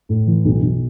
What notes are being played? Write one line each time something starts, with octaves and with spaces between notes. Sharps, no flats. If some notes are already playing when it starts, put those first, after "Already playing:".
A2
E3
B1
B1